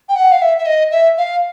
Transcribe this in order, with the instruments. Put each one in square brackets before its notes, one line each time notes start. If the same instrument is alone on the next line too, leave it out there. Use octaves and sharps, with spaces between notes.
[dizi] G5
F#5
F5
E5
E5
D#5
E5
F5